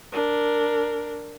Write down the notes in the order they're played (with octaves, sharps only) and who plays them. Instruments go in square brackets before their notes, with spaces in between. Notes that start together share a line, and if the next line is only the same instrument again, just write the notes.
[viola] D4 A#4